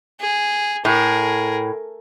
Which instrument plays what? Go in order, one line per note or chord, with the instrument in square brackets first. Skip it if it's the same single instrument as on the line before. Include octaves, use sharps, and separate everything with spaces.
[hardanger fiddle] G#4
[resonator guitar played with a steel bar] A2 [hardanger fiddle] G#4 A#4